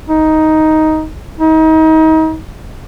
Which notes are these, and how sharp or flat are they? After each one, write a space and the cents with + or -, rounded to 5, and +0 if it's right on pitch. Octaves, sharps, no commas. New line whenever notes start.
D#4 +10
D#4 +30